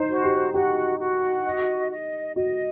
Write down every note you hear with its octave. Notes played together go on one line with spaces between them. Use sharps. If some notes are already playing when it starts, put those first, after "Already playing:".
Already playing: D#4 C5
F#4
G4
F#4 G4
F#4
D#5
D#5
F#4 D#5